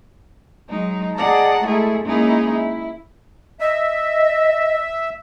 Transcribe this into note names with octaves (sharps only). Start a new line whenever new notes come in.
F#3 G#3 D#4
G#4 D5 D#5 F#5 A5 A#5
G#3 A3 E4 G#4 A4
G#3 A#3 C#4 D#4 E4 G#4
E4
D#5 E5